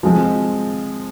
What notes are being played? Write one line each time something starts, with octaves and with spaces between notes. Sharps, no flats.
F3 G#3 C4